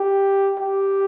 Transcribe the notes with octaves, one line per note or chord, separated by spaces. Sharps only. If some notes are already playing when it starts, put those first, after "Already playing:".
Already playing: G4
G4